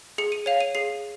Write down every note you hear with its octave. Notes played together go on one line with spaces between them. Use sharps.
G#4 C#7
D#7
C#5 F5 F7
D#7
G#4 C7